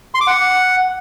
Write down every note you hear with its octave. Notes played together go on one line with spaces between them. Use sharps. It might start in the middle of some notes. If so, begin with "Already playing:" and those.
C6
D6
F#5